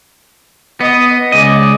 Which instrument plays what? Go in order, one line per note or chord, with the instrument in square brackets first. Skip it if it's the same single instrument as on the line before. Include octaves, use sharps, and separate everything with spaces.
[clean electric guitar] B3 [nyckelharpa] D#5
[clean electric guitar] C#2 D#5 [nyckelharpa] G#4 D5